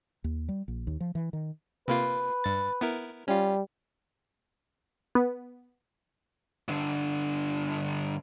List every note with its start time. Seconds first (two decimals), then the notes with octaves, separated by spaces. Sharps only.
0.24 D#2
0.49 G3
0.68 A#1
0.87 D#2
1.00 F3
1.15 E3
1.33 D#3
1.88 C3 A#3 F4 B4
2.44 G2 A6
2.81 B3 E4 A#4
3.28 G3 C#4 F4
5.15 B3
6.68 G2 D3